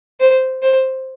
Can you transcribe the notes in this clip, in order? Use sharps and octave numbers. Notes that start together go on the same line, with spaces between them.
C5
C5